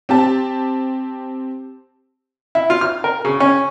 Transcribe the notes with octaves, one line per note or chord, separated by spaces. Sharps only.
C4 G4 A5
E4
F4
F6
A#4
C#3
C#4